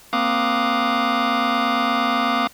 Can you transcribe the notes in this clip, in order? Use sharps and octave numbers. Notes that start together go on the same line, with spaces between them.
A#3 C4 F5 D6 D#6 F#6